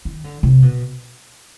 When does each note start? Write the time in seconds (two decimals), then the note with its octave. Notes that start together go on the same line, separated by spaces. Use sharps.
0.05 D#3
0.24 D3
0.43 C3
0.62 B2